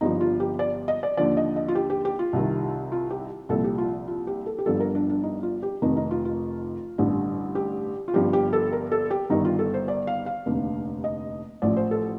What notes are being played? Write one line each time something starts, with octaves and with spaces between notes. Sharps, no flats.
G1 G2 F3 D#4
F4
G4
D5
D#5
D5
D#2 D3 F3 D5
D#5
D#5
F4
G4
G4
G4
F4
C2 C3 D#3
F4
G4
C2 A#2 F3 A4
G4
F4
F4
G4
A4
G4
G1 G2 D3 F3 A4
A#4
D4
D4
D#4
F4
G4
F1 F2 D#3 D#4
D#4
F4
F4
A1 G2 D3
G4
F4
G1 G2 F3 G4
G4
A4
A#4
A4
G4
G1 G2 D#3 D#4
F4
A4
C5
D5
F5
F5
F1 D#2 D3
D#5
A1 A2 F3 D5
C5
A4